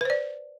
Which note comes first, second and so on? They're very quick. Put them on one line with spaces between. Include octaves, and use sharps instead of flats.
B4 C5 D5